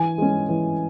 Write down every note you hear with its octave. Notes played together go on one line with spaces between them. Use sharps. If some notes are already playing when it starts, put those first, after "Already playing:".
Already playing: E3 G#5
G#3 C#4
E3